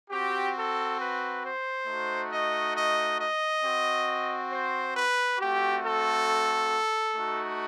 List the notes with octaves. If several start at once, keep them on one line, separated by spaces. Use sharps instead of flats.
C4 F#4 G4
A4
B4
C5
A3 D#4 F#4
D#5
D#5
D#5
C4 F#4
C5
B4
A3 C4 F#4 G4
A4
A3 D#4 F#4